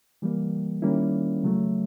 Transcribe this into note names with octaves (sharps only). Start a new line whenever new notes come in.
E3 G3 A#3
D#3 G3 A#3 C#4 E4
C#3 F#3 A3